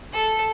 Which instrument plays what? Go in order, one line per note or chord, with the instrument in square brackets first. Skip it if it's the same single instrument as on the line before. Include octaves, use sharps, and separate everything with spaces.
[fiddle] A4